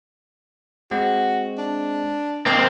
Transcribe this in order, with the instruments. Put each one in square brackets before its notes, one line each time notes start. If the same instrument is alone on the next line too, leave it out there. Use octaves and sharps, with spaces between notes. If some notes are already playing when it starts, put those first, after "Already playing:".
[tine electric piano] G#3 C4 [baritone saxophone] F#4
[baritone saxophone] D4
[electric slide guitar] A#3 C4 [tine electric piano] D#5 C6